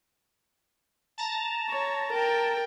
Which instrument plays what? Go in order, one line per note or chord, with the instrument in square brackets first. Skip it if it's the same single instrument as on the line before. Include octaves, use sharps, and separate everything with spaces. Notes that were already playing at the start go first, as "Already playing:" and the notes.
[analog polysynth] A5 A#5
[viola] C#5
A#4 G5